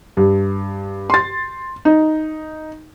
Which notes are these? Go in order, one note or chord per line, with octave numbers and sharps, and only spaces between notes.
G2
C6 A6
D#4